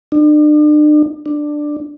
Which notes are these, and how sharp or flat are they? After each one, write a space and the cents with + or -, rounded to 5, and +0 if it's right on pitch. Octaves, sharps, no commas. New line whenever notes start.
D4 +40
D4 +10